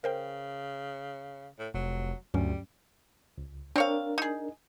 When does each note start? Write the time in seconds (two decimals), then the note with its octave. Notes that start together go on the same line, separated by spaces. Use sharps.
0.04 C#3 A#4 C5 G5
1.59 A2
1.74 F1 F#3
2.34 D2 G2 F#3 G3 C#4
3.38 C#2
3.76 C4 D4 A#4 C#5 F5
4.18 D#4 G#4